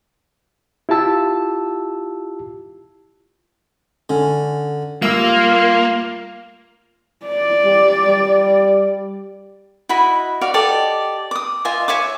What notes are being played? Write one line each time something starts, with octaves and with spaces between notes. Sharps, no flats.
E4 F4 G4 A5 E6
D3 C#4
G3 A#3 F4 E5 E6
D5
G3
G3
E4 F#4 D#5 B5
F#4 D5 F5
G4 A4 D5 D#5
D6 D#6
F4 D#5 E5 G#5
C#5 E5 G#5 D6